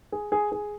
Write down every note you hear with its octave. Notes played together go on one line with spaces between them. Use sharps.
G#4
G#4
G#4